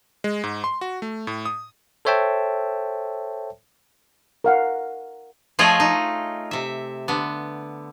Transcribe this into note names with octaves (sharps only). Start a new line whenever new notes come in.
G#3
G#2
C6
F#4
A3
A2
D#6
A4 C5 C#5 E5 G5 A5
A#4 F5 F#5
F3 A3 F4 G#4 C#5 D#5
D#4
C3 E5
D3 B3